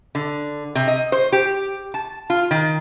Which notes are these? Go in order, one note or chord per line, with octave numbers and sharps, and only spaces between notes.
D3
C3
D#5
C5
G4
A5
F4
D#3